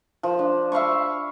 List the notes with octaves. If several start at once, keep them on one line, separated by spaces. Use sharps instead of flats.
F3
D4
E5 F5 B5 C#6